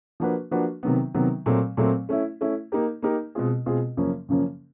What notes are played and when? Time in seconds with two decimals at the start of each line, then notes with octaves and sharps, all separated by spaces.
0.20 F3 A#3 D4 F#4 B4
0.51 F3 A#3 D4 F#4 B4
0.83 C3 D#3 F#3 B3
1.14 C3 D#3 F#3 B3
1.46 A#2 F#3 A3 C4
1.77 A#2 F#3 A3 C4
2.09 A3 C#4 E4
2.41 A3 C#4 E4
2.72 A#3 D#4 G4 A#4
3.02 A#3 D#4 G4 A#4
3.35 B2 G#3 C4 F4 G#4
3.66 B2 G#3 C4 F4 G#4
3.97 F#2 C#3 F3 A#3 C#4
4.29 F#2 C#3 F3 A#3 C#4